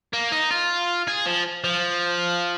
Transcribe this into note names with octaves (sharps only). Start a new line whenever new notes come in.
A#3
D#4
F4
G#4
F3
F3